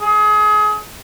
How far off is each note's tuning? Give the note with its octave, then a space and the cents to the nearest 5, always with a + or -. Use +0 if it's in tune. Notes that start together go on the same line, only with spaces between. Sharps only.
G#4 +30